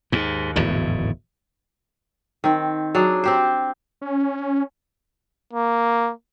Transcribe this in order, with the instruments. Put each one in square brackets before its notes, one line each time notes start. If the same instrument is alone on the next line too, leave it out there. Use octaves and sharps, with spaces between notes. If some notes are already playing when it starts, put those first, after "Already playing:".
[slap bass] D#2 G#2
D1 G#1 E2 A2
[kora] D#3 C4
F#3 D4 G#4
C4 G4 C5
[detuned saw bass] C#4
[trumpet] A#3